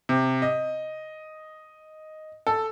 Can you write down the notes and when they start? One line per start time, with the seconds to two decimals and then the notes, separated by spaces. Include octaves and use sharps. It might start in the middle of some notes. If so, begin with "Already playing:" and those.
0.09 C3
0.42 D#5
2.47 A4